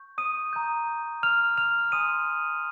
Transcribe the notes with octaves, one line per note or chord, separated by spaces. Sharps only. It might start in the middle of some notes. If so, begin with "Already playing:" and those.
Already playing: C#6 G6
D#6 D#7
A#5 D#6 G6
F6 F7
F6 F7
G#5 C6 D#6 D#7